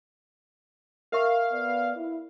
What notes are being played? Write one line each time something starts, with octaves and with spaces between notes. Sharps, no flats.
A#4 E5 F5 C#6
B3 D5
E4